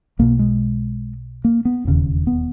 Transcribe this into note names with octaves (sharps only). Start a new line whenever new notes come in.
B1 B2 A#3
G#3
A#3
B3
E1 D#2 C#3
B3